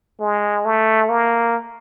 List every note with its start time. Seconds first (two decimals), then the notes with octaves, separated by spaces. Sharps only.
0.20 G#3
0.65 A3
1.09 A#3